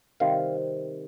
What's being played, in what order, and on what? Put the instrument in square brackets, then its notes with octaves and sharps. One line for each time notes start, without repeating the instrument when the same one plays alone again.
[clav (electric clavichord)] C3 D#3 G3 C4 F5